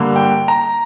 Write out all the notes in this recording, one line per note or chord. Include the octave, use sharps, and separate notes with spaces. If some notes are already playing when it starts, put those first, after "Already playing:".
Already playing: G2 D3 A#3
G5
A#5